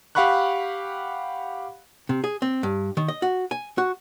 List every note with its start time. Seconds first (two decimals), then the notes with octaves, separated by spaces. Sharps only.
0.15 G4 F5 F#5 B5 C#6 F#6
2.09 C3
2.24 G#4
2.42 C4
2.63 G2
2.97 D#3
3.08 D#5
3.22 F#4
3.51 G#5
3.78 F#4